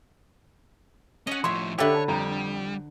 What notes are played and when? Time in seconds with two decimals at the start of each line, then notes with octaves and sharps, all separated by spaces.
1.27 C#4 D#5 F#5
1.44 A2 F3 C#5 E5 C6
1.78 D3 G4 A4 B4 C#5 E5
1.94 A5
2.08 F2 G3 A#5